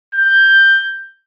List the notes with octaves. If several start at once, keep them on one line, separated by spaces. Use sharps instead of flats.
G6